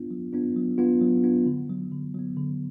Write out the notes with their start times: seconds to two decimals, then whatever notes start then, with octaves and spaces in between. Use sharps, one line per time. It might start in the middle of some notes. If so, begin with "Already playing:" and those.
Already playing: B3 D4 F4
0.11 F#3
0.33 B3 D4 F4
0.56 F#3
0.78 B3 D4 F4
1.01 F#3
1.24 B3 D4 F4
1.46 D3
1.69 F#3 B3
1.92 D3
2.14 F#3 B3
2.37 D3